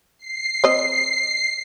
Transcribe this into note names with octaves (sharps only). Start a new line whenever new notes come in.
C7
C4 D#5